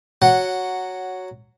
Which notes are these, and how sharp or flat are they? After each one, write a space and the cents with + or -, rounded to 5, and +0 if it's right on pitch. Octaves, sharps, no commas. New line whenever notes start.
F#3 +0 F#5 -5